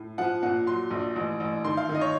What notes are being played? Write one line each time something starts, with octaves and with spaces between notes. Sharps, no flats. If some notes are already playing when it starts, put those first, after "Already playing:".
Already playing: A2
F3 F#5
A#2 F#5
F#3 C6
A#1
A1
A1
D#3 C6
F5
D#3
D#5
C#5